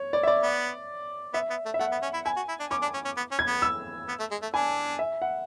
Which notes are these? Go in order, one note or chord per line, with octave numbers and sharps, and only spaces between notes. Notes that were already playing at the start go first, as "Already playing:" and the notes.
Already playing: C#5
D5
E5
D5
B3
B3 E5
B3
A3
E5
A3 F#5
B3
C#4
E4
E4 G#5
F#4
E4
D4
C#4 D6
D4
C#4
C#4
B3
C#4
G#6
B3
E6
B3
A3
G#3
A3
D4 G#5
E5
F#5